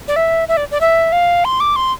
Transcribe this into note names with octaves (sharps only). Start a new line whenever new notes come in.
D5
E5
E5
D5
D5
E5
F5
C6
D6
C6